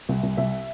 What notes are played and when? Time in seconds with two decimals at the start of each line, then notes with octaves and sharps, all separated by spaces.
0.09 C2
0.23 C2
0.37 C2 E5